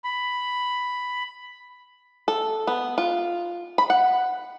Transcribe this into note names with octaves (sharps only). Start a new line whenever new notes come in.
B5
A4
B3
F4
B5
F#5